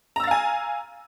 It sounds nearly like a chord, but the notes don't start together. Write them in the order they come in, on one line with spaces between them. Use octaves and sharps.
A#5 E6 A6 F5 G#5